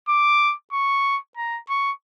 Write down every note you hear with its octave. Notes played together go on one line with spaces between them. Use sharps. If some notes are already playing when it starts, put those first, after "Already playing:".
D6
C#6
A#5
C#6